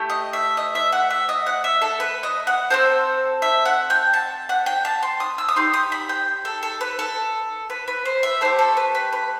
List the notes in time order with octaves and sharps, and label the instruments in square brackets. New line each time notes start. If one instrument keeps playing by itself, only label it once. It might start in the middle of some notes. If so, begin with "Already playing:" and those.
Already playing: [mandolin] A3 E4 G4
D#5
E5
D#5
E5
F#5
E5
D#5
F#5
E5
A4
B4
D#5
F#5
C4 F#4 A4 C5
E5
F#5
G5
A5
F#5
G5
A5
C6
D#6
E6
D#6
D#4 G4 C6
D#6
B5
G5
A4
A4
B4
A4
B4
B4
C5
E5
A3 D#4 G4 C5
A4
B4
B4
B4